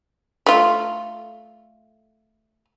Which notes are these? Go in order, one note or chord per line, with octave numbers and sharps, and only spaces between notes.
A3 F4